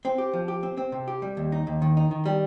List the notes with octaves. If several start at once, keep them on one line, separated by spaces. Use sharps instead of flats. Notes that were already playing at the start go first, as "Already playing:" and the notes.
C4
G4
F3
G4
C4
C4
C3
G4
G3
D#2
D#4
D#2
D#3
D#4
D#3
G3